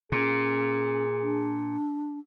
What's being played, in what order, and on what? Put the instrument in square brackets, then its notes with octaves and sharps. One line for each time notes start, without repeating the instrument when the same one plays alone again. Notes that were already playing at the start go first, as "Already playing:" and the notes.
[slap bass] A#2 [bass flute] C#4 [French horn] G#4
[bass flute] D4